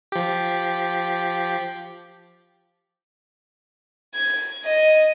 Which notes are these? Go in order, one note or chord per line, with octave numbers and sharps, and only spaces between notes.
F3 G4
G#6
D#5